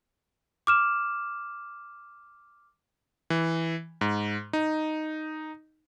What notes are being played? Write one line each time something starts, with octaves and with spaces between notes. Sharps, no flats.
D6 F6 E7
E3
G#2
D#4